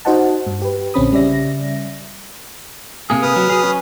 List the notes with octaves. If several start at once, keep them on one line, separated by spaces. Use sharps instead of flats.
D#4 F#4 C5 D#5 F#5 A5
G2
G4 B4
A#1 D3 C4 C#4 B5 D#6
C#3 G3 C#4 D5 E5 A#6
C3 A#3 G#4
B4 D#6 F6
F#3
F#3 G#4
C#4